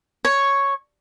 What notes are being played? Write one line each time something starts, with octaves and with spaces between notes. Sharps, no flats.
C#5